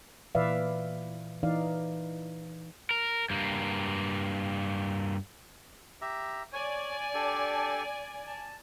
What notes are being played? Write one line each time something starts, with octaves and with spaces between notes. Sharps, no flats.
A#2 E3 B4 D5 E5 F5
E3 D#4 D5 F5
A#4
G2 A#3
G4 E5 A#5
C#5 D5 G#5
D4 G4 A4
A5